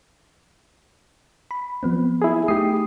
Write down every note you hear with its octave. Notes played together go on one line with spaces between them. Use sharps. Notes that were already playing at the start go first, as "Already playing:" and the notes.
B5
F3 B3 C4
E4 G#4
A3 D#4 G4 D#6 C7